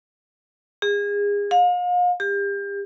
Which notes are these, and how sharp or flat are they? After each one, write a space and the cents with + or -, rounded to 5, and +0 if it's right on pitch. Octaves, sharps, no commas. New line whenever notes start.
G#4 -30
F5 +40
G4 +35